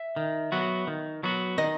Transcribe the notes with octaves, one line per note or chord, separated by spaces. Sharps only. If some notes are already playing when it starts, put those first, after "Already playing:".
Already playing: E5
D#3
F#3 B3 F#4
D#3
F#3 B3 F#4
D#3 D#5